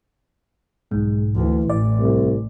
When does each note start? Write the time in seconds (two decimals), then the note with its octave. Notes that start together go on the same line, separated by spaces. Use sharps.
0.91 B1 G#2 G#3
1.36 D2 E3
1.70 A1 D5
2.00 C2